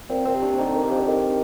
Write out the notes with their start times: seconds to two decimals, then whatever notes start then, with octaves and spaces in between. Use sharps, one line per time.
0.09 A#2 C4
0.25 A#2 C4
0.34 C3
0.42 D4
0.58 D3 D#4
0.74 D#3
0.83 G4
0.91 F3
0.99 D3
1.07 D#3